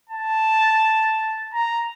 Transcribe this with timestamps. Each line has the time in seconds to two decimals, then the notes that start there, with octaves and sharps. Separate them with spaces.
0.09 A5
1.54 A#5